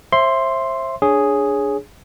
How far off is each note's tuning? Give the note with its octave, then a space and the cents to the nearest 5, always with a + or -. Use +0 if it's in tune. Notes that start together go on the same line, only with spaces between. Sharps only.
C5 +35 E5 +10 C6 +0
D4 +0 G#4 +0 C#5 +0